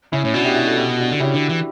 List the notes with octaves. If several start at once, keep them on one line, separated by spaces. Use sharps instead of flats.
C#3 C#4 E4
A2
B2 D4 F#4
E4 G4
E4 G4
F#4 A4
E4 G4
D4 F#4
D3
C#3 E4 G4
D3
E3